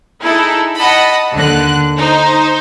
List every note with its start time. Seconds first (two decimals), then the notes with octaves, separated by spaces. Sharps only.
0.23 D#4 E4 G#4 A4
0.77 D#5 F#5 A5 B5
1.34 D#2 D3 F#6
1.97 D#4 C5